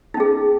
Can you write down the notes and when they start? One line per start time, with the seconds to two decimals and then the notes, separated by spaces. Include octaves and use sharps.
0.14 D#4
0.17 C#4
0.20 G#4